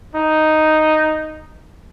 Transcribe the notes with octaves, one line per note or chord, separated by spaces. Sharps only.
D#4